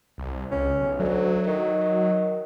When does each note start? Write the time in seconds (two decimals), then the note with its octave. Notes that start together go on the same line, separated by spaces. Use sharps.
0.18 C2
0.52 C#2 C#4
0.80 B1
1.00 D2 F#3
1.47 D#3